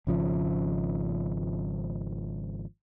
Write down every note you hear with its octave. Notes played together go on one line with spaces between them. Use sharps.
G#1 C#3 F3